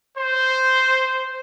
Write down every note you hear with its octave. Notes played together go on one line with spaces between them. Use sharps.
C5